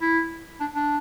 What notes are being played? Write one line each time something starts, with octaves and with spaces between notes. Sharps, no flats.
E4
D4
D4